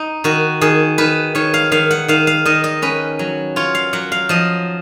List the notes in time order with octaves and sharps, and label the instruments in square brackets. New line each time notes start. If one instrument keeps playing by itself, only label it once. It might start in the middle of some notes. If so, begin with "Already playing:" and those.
Already playing: [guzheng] D#4
D#3 F#4
D#3 G#4
D#3 B4
D#3 C#5
F5
D#3 F5
F#5
D#3 F5
F5
D#3 D#5
D#5
C#4 B4
F#3
F4 C#5
F5
F#3 F#5
F5
F3 D#5